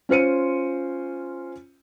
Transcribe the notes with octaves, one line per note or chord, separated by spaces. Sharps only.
C#4 F4 C5 C#7 D#7